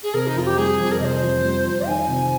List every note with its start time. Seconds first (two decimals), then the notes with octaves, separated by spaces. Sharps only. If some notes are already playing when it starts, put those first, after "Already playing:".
0.03 G#4
0.14 C3 A#4
0.26 D#4
0.35 F2 F4
0.46 G4
0.57 G3 G#4
0.79 F2
0.91 A#4
1.00 C3 D#5
1.04 C5
1.22 F2
1.44 G3
1.66 F2
1.87 D#3 G#5
2.08 C3